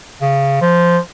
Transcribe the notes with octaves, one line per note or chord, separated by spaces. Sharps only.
C#3
F3